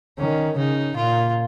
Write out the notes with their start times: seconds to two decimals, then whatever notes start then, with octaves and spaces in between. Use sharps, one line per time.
0.18 D#3 C#4
0.58 C#3 D#4
0.97 A#2 F4